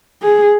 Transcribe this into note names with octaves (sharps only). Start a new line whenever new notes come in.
G#4